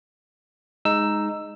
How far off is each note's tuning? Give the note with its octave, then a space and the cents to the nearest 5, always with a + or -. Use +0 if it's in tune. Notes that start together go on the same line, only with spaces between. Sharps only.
G#3 +0 D#4 +0 E6 +10